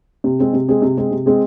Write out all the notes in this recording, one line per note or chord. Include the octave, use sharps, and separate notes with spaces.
C3
G#3 C4 G#4
C3
G#3 C4 G#4
C3
G#3 C4 G#4
C3
G#3 C4 G#4